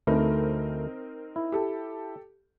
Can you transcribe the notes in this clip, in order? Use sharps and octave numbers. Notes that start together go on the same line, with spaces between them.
D2 A3 C4 D#4 A#4 B4
E4
G4 A4